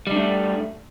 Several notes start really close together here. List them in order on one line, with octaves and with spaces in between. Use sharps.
G3 D4 A3